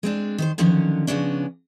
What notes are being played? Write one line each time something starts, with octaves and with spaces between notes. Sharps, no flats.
G#3 C4 D4
D#3 B4 C5
D3 D#3 F3 F#3 C#4
C#3 F3 G#3 B3 C#4 D4